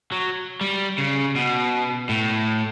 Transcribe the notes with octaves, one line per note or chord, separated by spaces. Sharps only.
F#3
G3
C#3
B2
A2